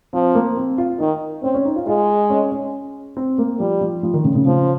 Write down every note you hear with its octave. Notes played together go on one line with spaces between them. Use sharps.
F3 C4
A#3
C4
F4
D#3 D#4
C4 C#4
C#4
D#4
F4
G#3 F4
C#4
C#4
C4
A#3
F3 G3
F3
F3
D#3
C#3
C#3
C#3 F3